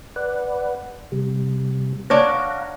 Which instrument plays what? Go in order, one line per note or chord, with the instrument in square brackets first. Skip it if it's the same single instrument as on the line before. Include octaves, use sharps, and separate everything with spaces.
[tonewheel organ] B4 D5 F#5
C3 G3
[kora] D4 C#5 [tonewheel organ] F5 F#5 A#5